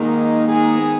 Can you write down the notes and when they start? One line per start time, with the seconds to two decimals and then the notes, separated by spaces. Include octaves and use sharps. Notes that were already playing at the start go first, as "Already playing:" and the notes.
Already playing: G#2 D#3 G#3 A#3 D#4
0.46 G#2 D#3 G#3 D#4 G#4
0.78 B3